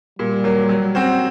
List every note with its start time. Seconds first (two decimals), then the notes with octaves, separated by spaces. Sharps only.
0.19 A#2 G3
0.44 F#3 A#3
0.69 F#3
0.95 C4 F#4 C5